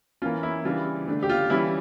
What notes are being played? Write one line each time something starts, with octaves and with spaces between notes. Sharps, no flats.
E3 A#3 C#4 F4
E4
C#3 E3 G3 D4 F4
D3 A3 D4
G4
F4
E3 G3 C#4 E4